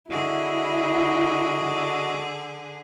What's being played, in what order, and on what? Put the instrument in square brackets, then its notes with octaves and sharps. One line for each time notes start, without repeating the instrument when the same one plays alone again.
[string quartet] D3 G#4 [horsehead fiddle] E4 [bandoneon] F#4 D#5